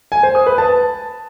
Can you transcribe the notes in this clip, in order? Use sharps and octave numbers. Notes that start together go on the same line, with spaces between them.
G#5
C5
D#6
B4
A5